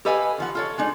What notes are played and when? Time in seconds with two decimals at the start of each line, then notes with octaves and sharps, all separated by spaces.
0.05 G4 A4 B4 D#5 F5 G#5
0.38 D#3 F3 F#5
0.55 F4 A4 C#5
0.78 G#3 D4 D#4